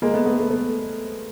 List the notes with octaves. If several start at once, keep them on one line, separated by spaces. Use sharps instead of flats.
G#3 A#3
A3 B3
A3 B3
A3 B3
A3 B3